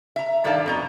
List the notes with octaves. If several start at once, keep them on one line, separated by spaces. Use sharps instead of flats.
E5 A#5
G2 D#3 A4 D5 F5 A5
F2 B2 A#5